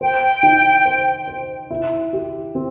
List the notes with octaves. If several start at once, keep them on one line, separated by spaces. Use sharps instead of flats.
C5 G5
D#4
C5
C5
E4
G4
C4